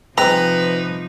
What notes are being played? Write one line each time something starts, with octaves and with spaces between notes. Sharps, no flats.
C3 F3 G#3 C4 D#4 B4 A#5